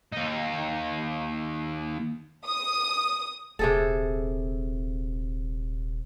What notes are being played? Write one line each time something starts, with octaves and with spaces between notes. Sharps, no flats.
D#2 D#4
D#6
D#1 C3 G#4 A4